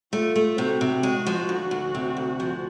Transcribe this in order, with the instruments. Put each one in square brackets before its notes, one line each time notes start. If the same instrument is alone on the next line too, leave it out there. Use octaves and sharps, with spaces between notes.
[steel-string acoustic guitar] A3 [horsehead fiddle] F4
[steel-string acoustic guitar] A3
[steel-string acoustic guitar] C3 [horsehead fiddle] F#4
[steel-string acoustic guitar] C3
G#3
F3
D2
D2
C3
D2
F3